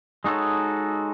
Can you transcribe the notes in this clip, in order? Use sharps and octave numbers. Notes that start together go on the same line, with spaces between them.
G#3 D#4 F#4 A4 C#5